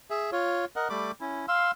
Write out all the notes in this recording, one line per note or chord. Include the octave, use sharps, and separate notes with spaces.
G#4 E5
F4 C#5
A#4 D#5 F#5
G3 A3 B5 D6
C#4 E4
F5 C6 E6